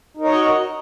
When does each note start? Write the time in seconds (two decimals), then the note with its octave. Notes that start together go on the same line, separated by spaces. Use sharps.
0.17 D#4
0.21 A#4
0.25 C#5
0.28 D#5
0.32 F#4